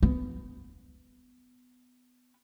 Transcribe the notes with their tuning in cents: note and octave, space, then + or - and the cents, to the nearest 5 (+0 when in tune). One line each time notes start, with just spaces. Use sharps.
B3 +15